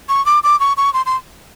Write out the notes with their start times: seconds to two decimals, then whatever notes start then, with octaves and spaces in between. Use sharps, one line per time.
0.09 C#6
0.26 D6
0.44 D6
0.60 C#6
0.77 C#6
0.94 C6
1.06 C6